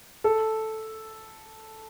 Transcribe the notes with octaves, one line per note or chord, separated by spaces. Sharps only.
A4